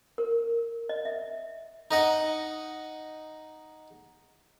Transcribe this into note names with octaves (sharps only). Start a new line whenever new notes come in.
A#4
D#5
E5
D#4 D#5 F#5